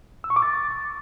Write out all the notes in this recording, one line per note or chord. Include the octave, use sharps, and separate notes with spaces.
E6
C#6
D6
A6